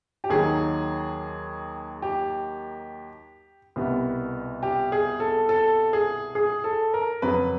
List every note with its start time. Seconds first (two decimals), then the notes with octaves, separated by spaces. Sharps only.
0.24 G4
0.29 D#2 D#3 F#3 G#4
2.02 G4
3.76 C2 B2 G3 B3
4.63 G4
4.92 G#4
5.20 A4
5.49 A4
5.93 G#4
6.35 G#4
6.64 A4
6.94 A#4
7.22 F2 C#3 F#3 B4